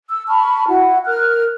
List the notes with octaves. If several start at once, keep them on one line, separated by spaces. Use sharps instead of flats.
E6
A5 B5 C#6 F6
E4 F#4 F#5
A#4 F6 F#6